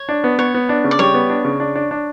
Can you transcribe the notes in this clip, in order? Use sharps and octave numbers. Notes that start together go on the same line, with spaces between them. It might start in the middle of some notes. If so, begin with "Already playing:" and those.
Already playing: C#5
D4
B3
B3 C#5
B3
D4
C#3
D5
G3 C#5
B3
D4
C#3
D4
D4
D4